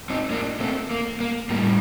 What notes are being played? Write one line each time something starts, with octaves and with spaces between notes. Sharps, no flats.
C4 D#4
A#3 D4
A3 C4
A#3
A#3
A2 G3 A#3